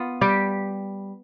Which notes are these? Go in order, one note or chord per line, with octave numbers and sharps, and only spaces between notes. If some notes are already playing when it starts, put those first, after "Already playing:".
Already playing: B3 F4
G3 G4